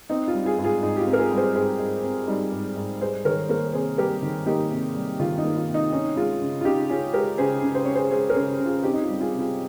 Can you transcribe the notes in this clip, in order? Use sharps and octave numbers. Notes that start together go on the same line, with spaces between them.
C4 D#4
F4
G3
F4 G#4
G#2
F4 G#4
G#2 D#4
G4
F4
C4
A#4
F4 G#4
G3
G#4 C5
G#2 G#4 C5
G#2
C4
G3 D#4
G#2
G#2
G3 G#4 C5
D#3 A#4 C#5
A#3 A#4 C#5
C3 G#4 C5
G3 G4 A#4
D#3
A#3 D#4 G4
C3
G3
D#3 F4
D#4
A#3
F4
C3
D#4
C#4 D#4
G#3 F4
C#3
F4
C#3 D#4 G4
C#4 F4 G#4
G#3 G4 A#4
C#3 G#4 C5
C#3
C5
C#4 C#5
G#4 C5
G#3 G#4 C5
A#4 C#5
C#3
C#3
F4 G#4
C4 D#4 G4
D#4
F4
G3
F4 G#4
C3
F4 G#4